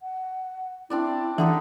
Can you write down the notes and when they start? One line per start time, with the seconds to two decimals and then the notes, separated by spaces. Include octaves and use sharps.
0.01 F#5
0.90 C4 D4 E4 D5
1.38 D3 E3 D#4 G4 F#5